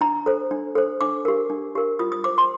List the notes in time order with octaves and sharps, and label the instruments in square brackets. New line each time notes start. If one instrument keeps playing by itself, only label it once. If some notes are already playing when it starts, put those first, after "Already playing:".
[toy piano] D4 A#5
A4 C5
D4
A4 C5
D4 D6
G4 A#4
D4
G4 A#4
F4 D#6
D#6
C5 D6
C6